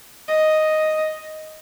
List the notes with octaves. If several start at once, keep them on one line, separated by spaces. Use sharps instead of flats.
D#5